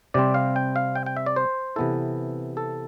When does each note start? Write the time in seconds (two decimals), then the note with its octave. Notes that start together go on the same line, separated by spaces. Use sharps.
0.14 C3 G3 C4 D5
0.34 F5
0.56 G5
0.76 F5
0.95 G5
1.06 G5
1.17 E5
1.26 D5
1.36 C5
1.76 C3 E3 B3 E4 A4
2.57 A4